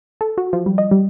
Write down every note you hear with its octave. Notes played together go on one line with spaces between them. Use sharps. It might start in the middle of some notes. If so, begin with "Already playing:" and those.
A4
F#4
F3
G3
D#5
G3